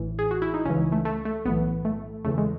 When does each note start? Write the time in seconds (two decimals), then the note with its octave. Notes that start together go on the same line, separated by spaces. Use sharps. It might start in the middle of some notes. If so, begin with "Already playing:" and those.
Already playing: A1 A2 E3
0.19 G#4
0.31 F#4
0.42 E4
0.54 D#4
0.65 C#2 C#3 E3 C#4
0.92 A3
1.05 A3
1.25 A3
1.45 B1 A2 E3 B3
1.85 A3
2.24 E2 C#3 E3 A3
2.38 G#3